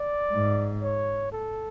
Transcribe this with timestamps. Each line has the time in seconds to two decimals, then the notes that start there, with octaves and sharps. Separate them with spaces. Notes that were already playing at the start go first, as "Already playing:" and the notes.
Already playing: D5
0.33 G#2
0.83 C#5
1.32 A4